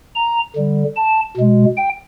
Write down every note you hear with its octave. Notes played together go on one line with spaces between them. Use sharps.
A#5
D3 G3
A5
B2 G#3
G5